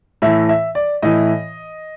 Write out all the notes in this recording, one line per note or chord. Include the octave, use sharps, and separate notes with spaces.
A2 E3 E5
E5
D5
A2 E3 D#5